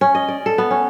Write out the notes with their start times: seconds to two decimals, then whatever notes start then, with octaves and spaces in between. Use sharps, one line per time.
0.01 C#4
0.15 D#5
0.28 D5
0.46 A4
0.58 B3
0.71 C#4